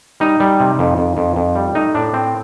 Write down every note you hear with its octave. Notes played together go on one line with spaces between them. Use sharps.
G3 D#4
G3
C3
F2
F2
F2
F2
G3
A3 D#4
A2 D4
A3 C4